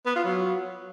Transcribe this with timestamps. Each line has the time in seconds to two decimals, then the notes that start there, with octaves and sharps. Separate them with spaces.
0.06 B3
0.15 F4
0.25 F#3